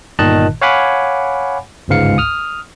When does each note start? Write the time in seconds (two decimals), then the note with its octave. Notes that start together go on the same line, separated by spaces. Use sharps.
0.19 G1 A#2 D#3 D#5 A5 F#6
0.62 C#5 F5 F#5 G#5 B5 D6
1.89 G1 C#2 G#2 F5 C#7
2.18 D#6 F6